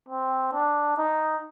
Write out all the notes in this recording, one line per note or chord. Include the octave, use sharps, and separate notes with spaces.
C4
D4
D#4